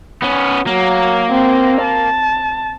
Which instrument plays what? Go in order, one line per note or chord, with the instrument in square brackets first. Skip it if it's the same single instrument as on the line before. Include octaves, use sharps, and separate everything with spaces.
[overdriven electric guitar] B3 C#4
[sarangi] F#3 [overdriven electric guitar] A#3
[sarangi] C4
A5